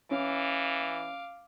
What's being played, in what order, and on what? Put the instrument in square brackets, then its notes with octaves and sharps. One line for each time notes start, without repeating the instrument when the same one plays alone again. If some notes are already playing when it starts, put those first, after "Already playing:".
[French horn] E3 [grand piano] C#4 [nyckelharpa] F5 D6